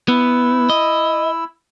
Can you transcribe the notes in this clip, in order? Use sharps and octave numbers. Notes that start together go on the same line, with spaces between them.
B3 E4 E6
D#5